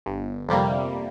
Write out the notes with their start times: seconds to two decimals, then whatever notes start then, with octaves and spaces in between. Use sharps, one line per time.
0.06 G1
0.49 F2 C3 G3 A#3